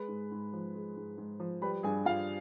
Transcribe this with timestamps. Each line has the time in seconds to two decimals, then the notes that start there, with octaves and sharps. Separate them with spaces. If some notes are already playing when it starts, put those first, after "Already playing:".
Already playing: G#3 B4 B5
0.08 G#2
0.31 G#2
0.53 F3
0.74 G#3
0.96 G#2
1.17 G#2
1.40 F3
1.62 G3 B4 B5
1.83 G2 G#4 G#5
2.05 G2 F4 F5